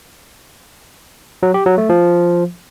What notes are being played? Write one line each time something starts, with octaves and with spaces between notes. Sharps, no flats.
F#3
G4
F#3
A3
F3